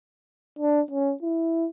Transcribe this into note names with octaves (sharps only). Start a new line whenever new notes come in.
D4
C#4
E4